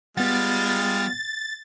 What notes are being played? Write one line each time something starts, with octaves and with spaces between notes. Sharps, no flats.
G3 G#3 B3 F4 F#5 A6